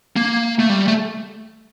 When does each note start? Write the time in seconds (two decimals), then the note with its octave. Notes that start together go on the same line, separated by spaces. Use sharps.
0.16 A#3
0.59 A3
0.69 G3
0.88 A3